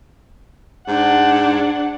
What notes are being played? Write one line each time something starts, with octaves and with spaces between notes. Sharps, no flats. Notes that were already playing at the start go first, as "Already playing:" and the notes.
G#2 D4 F#5